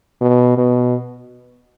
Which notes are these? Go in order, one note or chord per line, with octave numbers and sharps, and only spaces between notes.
B2
B2